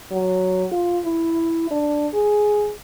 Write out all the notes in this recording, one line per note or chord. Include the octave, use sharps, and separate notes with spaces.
F#3
F4
E4
D4
G#4